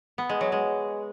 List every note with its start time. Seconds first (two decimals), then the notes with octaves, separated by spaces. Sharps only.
0.18 B3
0.29 G#3
0.41 F#3
0.52 G#3